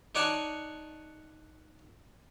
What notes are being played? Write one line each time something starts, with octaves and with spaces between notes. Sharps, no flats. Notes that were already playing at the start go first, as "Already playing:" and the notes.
D#4 C#5 D5 F#5 G#5 A5